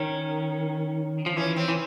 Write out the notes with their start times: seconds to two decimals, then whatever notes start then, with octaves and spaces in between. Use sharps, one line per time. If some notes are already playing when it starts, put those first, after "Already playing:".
Already playing: D#3 C#4
1.26 F3
1.36 E3 C#4
1.56 C4
1.68 E3